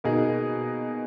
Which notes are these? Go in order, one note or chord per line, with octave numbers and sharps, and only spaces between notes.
B2 A#3 D#4 G#4 D#5